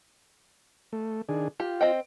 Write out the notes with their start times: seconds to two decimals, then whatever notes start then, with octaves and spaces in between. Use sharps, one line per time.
0.93 A3
1.29 D#3 D4 G#4
1.60 F4 G4
1.81 C4 D#5 G5